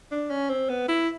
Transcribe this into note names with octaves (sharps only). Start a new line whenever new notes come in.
D4
C#4
C4
B3
E4